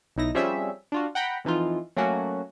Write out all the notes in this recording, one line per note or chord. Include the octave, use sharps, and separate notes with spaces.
B1 D#4 E4 A#6
F3 G3 C4 C#4 G#4 E5
D4 F4 F#4
F#5 G5 A#5 B5
F2 E3 D#4 F4
F#3 A3 A#3 C#4 F#4